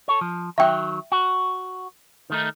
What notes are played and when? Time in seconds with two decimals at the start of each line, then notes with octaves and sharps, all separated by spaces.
0.08 A4 C#5
0.21 F3
0.58 D#3 F#3 E5 G5
1.12 F#4
2.30 D#3 A3 D#4